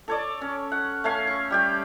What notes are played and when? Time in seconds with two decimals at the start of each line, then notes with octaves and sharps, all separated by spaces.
0.08 A4 C#5 D5
0.41 C#4
0.72 F#5
1.04 A3 C#4 F5 G#5
1.27 C#6
1.51 G3 G4 G5